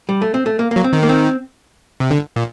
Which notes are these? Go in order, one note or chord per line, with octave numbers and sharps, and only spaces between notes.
G3
A3
C4
A3
A#3
F#3 A#3
C4
D#3
A#3
C4
C3
D3
A#2